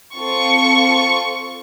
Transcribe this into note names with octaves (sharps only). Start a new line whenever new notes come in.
C4 F4 A4 C#6